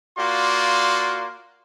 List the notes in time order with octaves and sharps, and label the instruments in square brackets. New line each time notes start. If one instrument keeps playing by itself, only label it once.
[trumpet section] A#3 F4 F#4 D5 C6